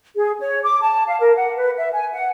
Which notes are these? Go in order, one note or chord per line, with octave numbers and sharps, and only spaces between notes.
G#4
C#5
D6
A5
F5
A#4
F#5
B4
E5
G#5
F#5